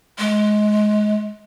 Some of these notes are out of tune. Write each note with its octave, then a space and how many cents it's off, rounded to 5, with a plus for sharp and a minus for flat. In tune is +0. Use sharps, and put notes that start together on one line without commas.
G#3 +20